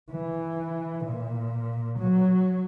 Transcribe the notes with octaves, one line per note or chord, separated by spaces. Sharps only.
E3
A#2
F#3